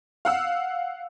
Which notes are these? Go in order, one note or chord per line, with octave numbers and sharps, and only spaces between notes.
F5 F#5 E6